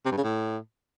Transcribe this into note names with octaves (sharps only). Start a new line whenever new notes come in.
C3
G2
C#3
A2